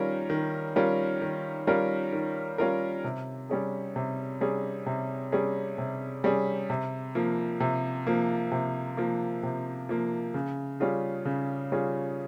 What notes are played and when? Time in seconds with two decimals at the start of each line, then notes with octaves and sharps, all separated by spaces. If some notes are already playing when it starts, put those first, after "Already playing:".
Already playing: D#3 G3 C#4 F4 A#4
0.30 D#3
0.76 G3 C#4 F4 A#4
1.21 D#3
1.67 G3 C#4 F4 A#4
2.13 D#3
2.58 G3 C#4 F4 A#4
3.04 C3
3.49 G3 C#4 G#4
3.96 C3
4.41 G3 C#4 G#4
4.86 C3
5.32 G3 C#4 G#4
5.78 C3
6.24 G3 C#4 G#4
6.70 C3
7.15 F3 A#3
7.60 C3
8.07 F3 A#3
8.52 C3
8.97 F3 A#3
9.43 C3
9.89 F3 A#3
10.34 C#3
10.80 G3 C#4 F4 G#4
11.25 C#3
11.72 G3 C#4 F4 G#4